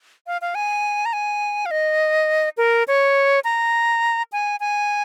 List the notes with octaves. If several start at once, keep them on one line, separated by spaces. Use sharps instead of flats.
F5
F5
G#5
A#5
G#5
F5
D#5
A#4
C#5
A#5
G#5
G#5